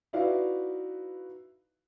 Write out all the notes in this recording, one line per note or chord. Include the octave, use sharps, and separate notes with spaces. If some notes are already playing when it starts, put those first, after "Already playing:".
D#4 E4 F#4 B4 D5 F5